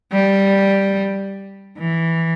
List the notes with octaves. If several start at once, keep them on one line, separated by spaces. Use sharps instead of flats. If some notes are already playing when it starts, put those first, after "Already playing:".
G3
E3